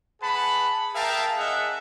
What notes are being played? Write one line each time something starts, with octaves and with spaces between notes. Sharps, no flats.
G#4 B4 F#5 A5 B5
G#4 A#4 E5 F5 G5 A5
C#4 G#4 D#5 E5 F#5